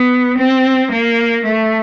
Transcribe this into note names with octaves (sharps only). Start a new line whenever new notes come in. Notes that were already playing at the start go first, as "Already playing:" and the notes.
Already playing: B3
C4
A#3
A3